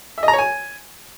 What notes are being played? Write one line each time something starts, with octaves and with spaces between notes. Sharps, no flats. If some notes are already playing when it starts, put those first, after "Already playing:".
E5
D#5
A#5
C#5
G#5